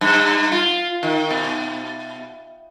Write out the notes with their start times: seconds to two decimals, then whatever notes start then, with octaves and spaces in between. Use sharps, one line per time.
0.01 G2
0.52 F4
1.03 D#3
1.31 B2